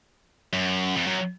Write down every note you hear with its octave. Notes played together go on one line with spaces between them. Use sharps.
F#2
F2
F#2